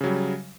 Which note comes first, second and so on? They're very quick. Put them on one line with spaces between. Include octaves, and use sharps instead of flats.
C#3 F#3 G3